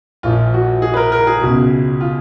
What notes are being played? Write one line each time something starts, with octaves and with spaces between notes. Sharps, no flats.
A#1 A#2 F3 F4
F#4
G#4
B4
A#4
A#4
G#4
C#2 B2
F4